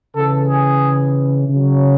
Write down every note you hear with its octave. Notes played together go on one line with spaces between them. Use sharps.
C#3 E3 A4
G#4
C#3 F#3